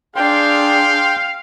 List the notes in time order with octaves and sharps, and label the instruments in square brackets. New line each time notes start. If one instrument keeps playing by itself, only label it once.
[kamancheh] D4 G#4 [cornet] F5 [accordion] G5 C6